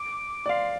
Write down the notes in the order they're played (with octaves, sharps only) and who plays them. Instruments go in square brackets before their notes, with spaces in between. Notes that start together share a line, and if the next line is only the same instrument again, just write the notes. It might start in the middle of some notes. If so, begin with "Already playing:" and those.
Already playing: [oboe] D6
[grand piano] D5
[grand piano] F5 [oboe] C6